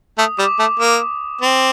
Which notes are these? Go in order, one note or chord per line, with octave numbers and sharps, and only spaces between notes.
A3 D#6
G3 D6
A3 D6
A#3 D6
C4